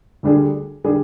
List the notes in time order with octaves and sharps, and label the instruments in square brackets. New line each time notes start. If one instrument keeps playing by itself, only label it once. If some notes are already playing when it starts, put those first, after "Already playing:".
[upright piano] D2 D3 G3 D4 G#4
D3 G3 D4 G#4